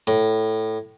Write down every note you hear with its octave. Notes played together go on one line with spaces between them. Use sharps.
A2